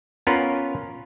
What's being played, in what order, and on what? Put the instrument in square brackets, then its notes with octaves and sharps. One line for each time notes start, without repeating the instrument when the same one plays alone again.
[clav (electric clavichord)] B3 C#4 F4 A#4 B4 C#5